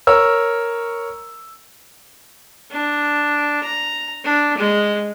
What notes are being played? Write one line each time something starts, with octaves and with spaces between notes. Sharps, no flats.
A#4 C#5 E6
D4
A#5
D4
G#3